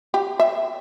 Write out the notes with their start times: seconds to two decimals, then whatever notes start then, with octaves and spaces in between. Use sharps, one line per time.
0.14 G4
0.40 E5